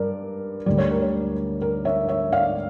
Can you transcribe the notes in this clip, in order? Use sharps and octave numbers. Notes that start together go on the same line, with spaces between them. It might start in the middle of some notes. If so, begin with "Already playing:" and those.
Already playing: G2 A#4 D5
D2 D3 G3 D5
C#5
A#4
C#5
A#4
C#5 E5
C#5 E5
D5 F5